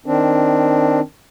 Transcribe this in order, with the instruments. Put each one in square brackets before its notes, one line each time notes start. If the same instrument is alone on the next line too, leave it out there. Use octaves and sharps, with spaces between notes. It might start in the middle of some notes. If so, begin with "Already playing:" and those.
[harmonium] D#3 C4 D4